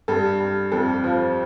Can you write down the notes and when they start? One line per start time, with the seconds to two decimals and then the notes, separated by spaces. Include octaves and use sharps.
0.08 G2 A4
0.40 G2
0.72 F2 A4
1.04 F3